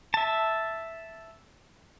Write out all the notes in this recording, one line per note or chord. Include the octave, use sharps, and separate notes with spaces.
E5 A5